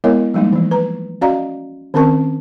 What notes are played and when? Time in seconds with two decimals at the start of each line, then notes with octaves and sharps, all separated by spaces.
0.04 G#3 B3 E4 A#4 C#5 D#5
0.34 F3 G3 G#3 A#3 D#4
0.53 E3 F3
0.71 B4 A#5
1.21 C#4 F#4 D5 D#5 F5 A#5
1.94 D#3 C4 C#4 A#4 A5 C#6